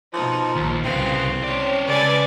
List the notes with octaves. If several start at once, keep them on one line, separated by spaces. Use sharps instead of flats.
B2 F3 D#4
A#1 D#2
C2 C#3 B3 C4 F5
C#4 C#5 D5
C#2 C#3 A4 B4 D5 G#5